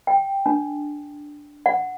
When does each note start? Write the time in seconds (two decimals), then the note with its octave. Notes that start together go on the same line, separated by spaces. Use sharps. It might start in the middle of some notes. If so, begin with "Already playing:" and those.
0.07 G5
0.46 D4
1.66 F#5